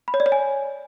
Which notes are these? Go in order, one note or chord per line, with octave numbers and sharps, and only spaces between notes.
B5
C#5
D5
C#5
G#5